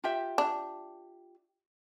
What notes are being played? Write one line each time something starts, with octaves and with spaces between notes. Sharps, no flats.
F4 G4 E5
D4